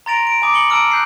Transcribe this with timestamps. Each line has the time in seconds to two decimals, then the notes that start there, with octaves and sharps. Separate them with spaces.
0.06 A#5 C6 A6 A#6 D7 F7
0.27 D7
0.42 G#5 B5 D6 D#6 D7
0.53 C#7 F#7 G7
0.70 A5 A#5 E6 F6 D7
0.91 F#6 G6 C7